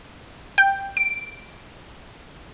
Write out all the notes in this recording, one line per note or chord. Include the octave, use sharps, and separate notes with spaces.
G5
D7